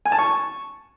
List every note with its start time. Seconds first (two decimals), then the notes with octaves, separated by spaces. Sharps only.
0.06 G#5
0.12 A5
0.19 C#6